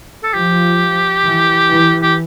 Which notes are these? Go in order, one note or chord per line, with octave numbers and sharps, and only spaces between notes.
A4
F3 G4
E3
E3
G4